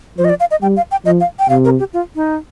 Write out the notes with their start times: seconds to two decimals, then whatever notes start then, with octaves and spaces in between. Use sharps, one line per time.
0.18 F3 C5
0.25 D#5
0.29 D5
0.40 F5
0.51 D#5
0.62 G3 G5
0.77 F5
0.91 G5
1.06 F3 D#5
1.20 F5
1.39 G5
1.49 C3 F5
1.65 A#4
1.79 G4
1.93 F4
2.15 D#4